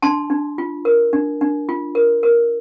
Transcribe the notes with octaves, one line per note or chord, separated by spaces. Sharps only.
D4 A5 C6
D4
F4
A#4
D4
D4
F4
A#4
A#4